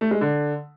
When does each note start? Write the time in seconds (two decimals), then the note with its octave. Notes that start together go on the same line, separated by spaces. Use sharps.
0.01 A3
0.11 G#3
0.21 D3